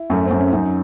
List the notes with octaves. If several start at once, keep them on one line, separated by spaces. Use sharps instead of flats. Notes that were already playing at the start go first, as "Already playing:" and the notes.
Already playing: E4
F#2 A3
F#2 C4
C#4
F#2 D#4